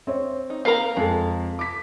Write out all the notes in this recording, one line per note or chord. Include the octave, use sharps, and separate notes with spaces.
C4 C#5
D#4
A#4 B4 F5 A#5
F2 G#3 A4
D6 B6